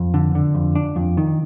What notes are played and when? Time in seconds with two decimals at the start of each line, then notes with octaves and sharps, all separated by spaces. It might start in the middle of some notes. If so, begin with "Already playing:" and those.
Already playing: F2
0.14 D3
0.35 D3
0.55 F2
0.76 D4
0.96 F2
1.17 D#3